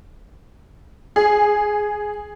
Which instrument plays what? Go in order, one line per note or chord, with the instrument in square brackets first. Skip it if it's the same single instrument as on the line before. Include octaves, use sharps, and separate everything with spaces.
[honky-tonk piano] G#4